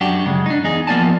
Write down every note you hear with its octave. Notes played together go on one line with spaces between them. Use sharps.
F#2 D4 F#4 G4
F#2 C#3 G#3
D4 D#4
E2 D#4 G#4
F3 A#3 B3 D5 G#5 A5